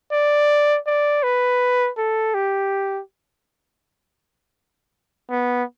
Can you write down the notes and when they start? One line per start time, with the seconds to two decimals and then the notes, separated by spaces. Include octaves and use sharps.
0.12 D5
0.86 D5
1.23 B4
1.98 A4
2.34 G4
5.30 B3